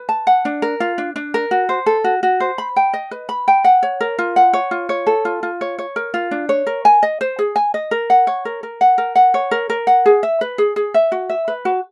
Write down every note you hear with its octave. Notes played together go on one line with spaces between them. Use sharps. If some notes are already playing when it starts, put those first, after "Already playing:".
Already playing: B4
A5
F#5
D4
A#4
F4
D4
D4
A#4
F#4
C5
A4
F#4
F#4
C5
B5
G5
D#5
B4
B5
G5
F#5
C#5
A#4
F4
F#5
C#5
F4
C#5
A4
F4
F4
C#5
C#5
A#4
F4
D4
C#5
A#4
G#5
D#5
C5
G#4
G#5
D#5
A#4
F#5
C#5
A#4
A#4
F#5
A#4
F#5
C#5
A#4
A#4
F#5
G#4
E5
B4
G#4
G#4
E5
F#4
E5
B4
F#4